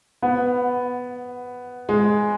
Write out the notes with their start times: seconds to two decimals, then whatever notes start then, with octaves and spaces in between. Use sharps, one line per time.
0.22 B3
1.89 G#3